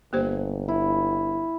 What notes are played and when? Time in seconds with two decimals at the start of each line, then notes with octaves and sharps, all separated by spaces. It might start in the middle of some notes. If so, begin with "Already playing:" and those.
0.13 G1 A#3 G4 C5
0.68 E4